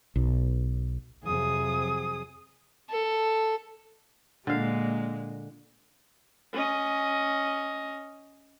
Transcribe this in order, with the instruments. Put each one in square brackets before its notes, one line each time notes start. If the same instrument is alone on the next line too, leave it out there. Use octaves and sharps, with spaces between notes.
[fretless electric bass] B1
[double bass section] F2 C3 F#3 [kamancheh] G#4 D#6
[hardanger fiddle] A4
[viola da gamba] A#2 G#3 A#3 [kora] D3 F5
[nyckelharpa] C#4 D#5